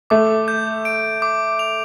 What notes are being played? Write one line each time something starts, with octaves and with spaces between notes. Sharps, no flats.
A3 D6
G6
D7
D6
F7